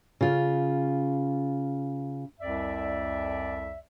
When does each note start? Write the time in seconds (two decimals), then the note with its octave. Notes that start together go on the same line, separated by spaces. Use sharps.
0.21 C#3 F4
2.40 C2 F2 D5 E5